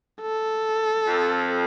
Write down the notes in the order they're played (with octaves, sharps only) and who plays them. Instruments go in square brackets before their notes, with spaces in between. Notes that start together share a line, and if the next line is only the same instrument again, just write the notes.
[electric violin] A4
[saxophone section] F2